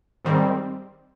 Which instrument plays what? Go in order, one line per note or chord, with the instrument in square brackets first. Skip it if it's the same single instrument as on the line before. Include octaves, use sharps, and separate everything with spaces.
[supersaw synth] G#2 D#3 G3 C4